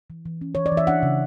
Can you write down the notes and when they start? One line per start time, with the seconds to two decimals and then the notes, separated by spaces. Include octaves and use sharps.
0.10 E3
0.25 E3
0.41 C#4
0.55 E3 C#5
0.66 D5
0.72 E3
0.77 E5
0.87 D4 F#5
1.03 C#3